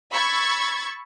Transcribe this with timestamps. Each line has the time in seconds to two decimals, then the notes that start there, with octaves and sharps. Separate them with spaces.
0.12 B5 C#6 E6 G#6 A6